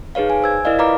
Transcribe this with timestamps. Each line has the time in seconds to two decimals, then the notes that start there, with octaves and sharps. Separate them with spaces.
0.15 D#4 G#4 B4 C#5 F5
0.30 G#5
0.42 C5 E6 G#6
0.65 E4 A#4 D5 D#5 F5
0.78 F4 B4 F5 A#5 B5 D6